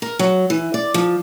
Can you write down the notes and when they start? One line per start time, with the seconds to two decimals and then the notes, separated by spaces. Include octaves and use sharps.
0.02 A#4
0.19 F#3
0.50 E3
0.74 D5
0.94 F3